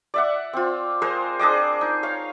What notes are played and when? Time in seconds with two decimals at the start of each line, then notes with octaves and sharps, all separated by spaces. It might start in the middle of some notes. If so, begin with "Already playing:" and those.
0.14 D5 E5 F#5
0.53 C4 F4
1.02 G#3 A#4 C5
1.39 D4 G#4 D#5 D6
1.81 D#4
2.03 C#5 F5